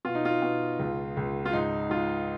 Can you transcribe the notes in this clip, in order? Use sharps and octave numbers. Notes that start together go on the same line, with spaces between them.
B2 F4
D#4
F4
B2
C#2
C#2
F4
G#2 D#4
G#2 F4